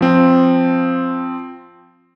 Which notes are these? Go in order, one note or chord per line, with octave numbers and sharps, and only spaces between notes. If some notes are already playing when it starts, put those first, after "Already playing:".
F3 C4